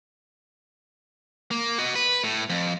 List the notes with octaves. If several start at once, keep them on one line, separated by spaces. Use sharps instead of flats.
A#3
F#4 D#5
B4
A2
F2